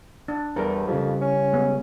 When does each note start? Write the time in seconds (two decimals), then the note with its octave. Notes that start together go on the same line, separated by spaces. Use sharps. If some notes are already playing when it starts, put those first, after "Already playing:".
0.28 D4
0.56 E2 G3 G4 A4 A#4
0.87 F2 C#3 G3
1.21 C#4
1.53 G#3 B3